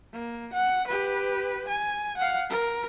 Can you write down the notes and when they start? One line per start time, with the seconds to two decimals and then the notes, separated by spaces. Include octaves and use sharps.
0.13 A#3
0.53 F#5
0.87 G4 B4
1.68 G#5
2.17 F5 F#5
2.50 A#4